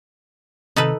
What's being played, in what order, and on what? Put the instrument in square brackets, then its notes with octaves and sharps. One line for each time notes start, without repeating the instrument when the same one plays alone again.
[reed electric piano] C3 D#3 E6 [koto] D#4 A4 B4